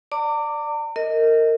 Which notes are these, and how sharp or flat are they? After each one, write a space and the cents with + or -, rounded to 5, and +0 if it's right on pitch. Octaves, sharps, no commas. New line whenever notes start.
D5 +0 A#5 -45 D6 +0
A#4 -20 D#5 +15